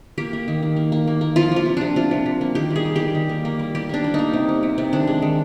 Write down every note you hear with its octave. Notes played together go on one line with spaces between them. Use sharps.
A#3 G4
A#3
D#3
D#3
A#3
A#3
A#3
A#3
F3 F4
A#3 F4
C3
C3 D4
C3 F4
C3
C3
A#3
D#3 G4
G3
G#4
G3
G3 G4
D#3
A#3
A#3
G3
G3 G4
A#3 D4
G3
A#3 D#4
C3
A#3
C3
C3
D#3 D4
G#3
D#3